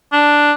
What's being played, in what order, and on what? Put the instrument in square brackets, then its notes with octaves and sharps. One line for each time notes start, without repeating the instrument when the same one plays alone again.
[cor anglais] D4